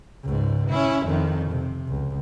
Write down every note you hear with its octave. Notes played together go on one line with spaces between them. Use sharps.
C#2 G#2
C#4 E4
F2 D#3
C3
C#2